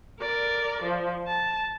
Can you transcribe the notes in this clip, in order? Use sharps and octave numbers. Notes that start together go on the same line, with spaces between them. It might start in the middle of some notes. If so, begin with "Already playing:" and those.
A#4 D5
F3
A5